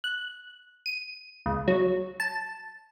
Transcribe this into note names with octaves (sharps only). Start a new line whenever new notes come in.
F#6
D#7
C#2
F#3
A5